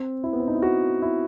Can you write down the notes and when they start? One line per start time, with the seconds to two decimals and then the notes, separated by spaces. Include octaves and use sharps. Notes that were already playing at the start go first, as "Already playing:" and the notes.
Already playing: C4
0.24 E4
0.33 B3
0.40 C4
0.48 D#4
0.55 E4
0.62 F#4
1.02 E4